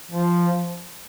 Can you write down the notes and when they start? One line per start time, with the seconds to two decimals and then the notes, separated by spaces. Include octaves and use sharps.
0.11 F3